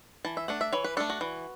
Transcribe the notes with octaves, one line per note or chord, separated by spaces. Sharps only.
E3 A5
E5
A3 D4 F#5
E5
E3 C#5
B4
A3 D4 A4
F#4
E3